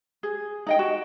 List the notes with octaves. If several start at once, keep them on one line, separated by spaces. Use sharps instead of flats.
G#4
D#4 D#5 G5
F#4